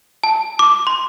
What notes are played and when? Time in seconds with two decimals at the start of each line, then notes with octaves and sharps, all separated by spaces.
0.24 A5
0.59 D6
0.87 C6